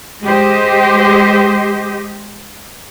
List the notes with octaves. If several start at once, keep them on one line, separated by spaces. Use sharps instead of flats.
G#3 G4 C5 D#5